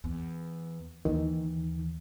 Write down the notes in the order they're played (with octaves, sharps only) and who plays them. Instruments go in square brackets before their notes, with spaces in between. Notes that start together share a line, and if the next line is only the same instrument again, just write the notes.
[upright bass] E2
[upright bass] D#2 E3 [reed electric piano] D#3